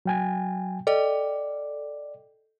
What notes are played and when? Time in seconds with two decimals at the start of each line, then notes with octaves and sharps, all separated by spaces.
0.05 F#3 G5 G#5
0.87 A4 D5 D#5 G5